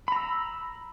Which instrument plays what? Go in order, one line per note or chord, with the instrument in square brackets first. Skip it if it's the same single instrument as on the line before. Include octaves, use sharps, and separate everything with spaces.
[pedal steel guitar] B5
A#5
E6